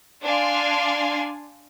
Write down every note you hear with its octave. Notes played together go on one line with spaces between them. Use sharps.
D4 D5 F5 G#5 C6